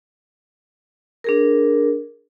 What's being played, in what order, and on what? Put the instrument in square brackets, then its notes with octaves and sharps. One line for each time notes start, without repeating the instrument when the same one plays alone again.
[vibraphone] D4 G#4 A#4